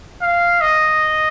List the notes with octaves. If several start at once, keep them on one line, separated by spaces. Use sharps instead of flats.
F5
D#5